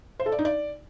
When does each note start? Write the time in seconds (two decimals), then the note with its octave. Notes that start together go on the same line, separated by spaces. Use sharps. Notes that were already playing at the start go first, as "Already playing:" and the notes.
0.20 C5
0.26 A4
0.32 D5
0.39 D#4
0.45 D5